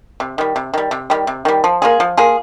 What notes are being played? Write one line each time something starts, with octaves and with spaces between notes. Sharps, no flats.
C3
D#3 G3
C3
D#3 G3
C3
D#3 G3
C3
D#3 G3
F3
A#3 F4 G#4
F3
A#3 F4 G#4